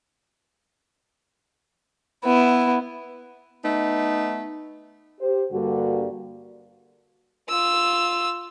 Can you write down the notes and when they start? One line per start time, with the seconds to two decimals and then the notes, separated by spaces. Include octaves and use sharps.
2.24 B3 E4
3.64 A3 B3 D#4
5.21 G4 C5
5.52 G2 D3 G3 A#3 F#4
7.49 F4 E6